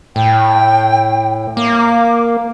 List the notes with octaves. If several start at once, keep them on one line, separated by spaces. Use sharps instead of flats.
A2 G5
A#3 D6